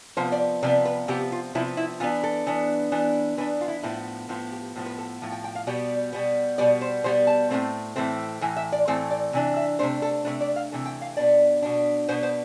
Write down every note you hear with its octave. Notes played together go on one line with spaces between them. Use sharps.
C3 F3 B3 C5
D5
C3 F3 B3 D5
B4
C3 F3 B3 G4
F4
C3 F3 B3 E4
E4
E3 B3 D4 F4
A4
E3 B3 D4
E3 B3 D4
E3 B3 D4 B4
F4
E4
A2 F3 B3 E4
A2 F3 B3 F4
G4
A2 F3 B3
B4
A4
A2 F3
G5
G5
F5
B2 G3 B3 D5
B2 G3 B3
B2 G3 B3 D5
C5
B2 G3 B3 C5
A5
A2 E3 A3 C4
A2 E3 A3 C4
A2 E3
E5
D5
A2 E3 A3 C4 C5
D5
C3 E3 D4
E5
C3 E3 A3 D4 C5
A4
C3 E3 A3 D4 B4
D5
F5
C3 E3 A3
G5
F5
B2 B3 D4 D5
B2 B3 D4
B2 B3 D4 C5
C5